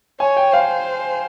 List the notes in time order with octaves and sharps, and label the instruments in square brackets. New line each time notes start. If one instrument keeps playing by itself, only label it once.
[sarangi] C#5 [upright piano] G#5
[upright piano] G5
[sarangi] C5 [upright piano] F5